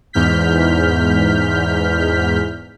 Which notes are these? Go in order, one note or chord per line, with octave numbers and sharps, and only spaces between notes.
E2 G#2 F6 G6 B6